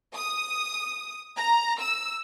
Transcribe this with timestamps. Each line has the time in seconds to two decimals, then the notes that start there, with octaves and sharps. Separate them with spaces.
0.16 D#6
1.37 A#5
1.80 E6